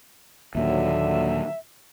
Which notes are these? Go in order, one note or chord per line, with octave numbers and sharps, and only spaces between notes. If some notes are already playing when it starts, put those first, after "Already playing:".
D#2 A#2 D3 F#3 E5